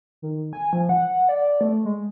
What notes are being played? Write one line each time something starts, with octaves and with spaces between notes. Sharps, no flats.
D#3
G#5
F3
F#5
D5
A3
G#3